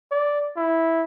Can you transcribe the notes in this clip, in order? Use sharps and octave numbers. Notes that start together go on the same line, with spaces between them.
D5
E4